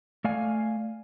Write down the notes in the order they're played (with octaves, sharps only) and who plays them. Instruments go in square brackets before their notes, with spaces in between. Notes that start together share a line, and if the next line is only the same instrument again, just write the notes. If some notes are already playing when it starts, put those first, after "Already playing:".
[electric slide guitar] A3 D5 F5 G#5